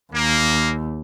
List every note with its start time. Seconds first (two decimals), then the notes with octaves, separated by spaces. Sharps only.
0.13 D#2 A#3